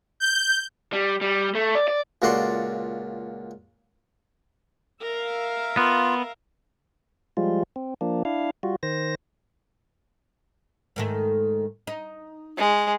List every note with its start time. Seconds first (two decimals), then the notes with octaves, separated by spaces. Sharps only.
0.20 G6
0.93 G3
1.21 G3
1.55 A3
1.75 D5
1.88 D5
2.22 C#2 A#2 F#4 A4 D5 C6
5.02 A#4 E5 F5
5.77 B3 F4
7.37 F3 G3 G#3 F4
7.76 C4
8.01 F3 A#3 D4
8.25 D4 E4 F5
8.63 G3 F4 F#4
8.83 D#3 C5 A#6
10.96 G#2 D#3 A3
11.87 D#4
12.58 G#3